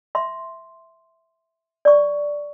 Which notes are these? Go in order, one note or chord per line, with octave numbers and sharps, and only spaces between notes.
E5 C6
D5 C#6